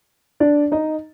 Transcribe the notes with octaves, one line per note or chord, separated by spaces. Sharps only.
D4 D5
D#4 D#5